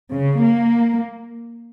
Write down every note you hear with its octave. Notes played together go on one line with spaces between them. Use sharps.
C#3
A#3